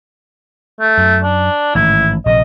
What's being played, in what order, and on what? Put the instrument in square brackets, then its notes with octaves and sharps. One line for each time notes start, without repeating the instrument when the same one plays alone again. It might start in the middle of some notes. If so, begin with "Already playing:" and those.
[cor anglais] A3
[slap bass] F#2
[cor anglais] D4
[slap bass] A1 G#2 D#3 [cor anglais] E4
[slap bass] A#1 C3 [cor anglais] D#5